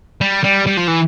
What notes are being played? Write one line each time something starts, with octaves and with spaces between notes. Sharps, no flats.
G3
G3
G3
F3
E3